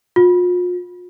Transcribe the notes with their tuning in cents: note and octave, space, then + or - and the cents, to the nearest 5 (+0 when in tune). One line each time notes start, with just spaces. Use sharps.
F4 +40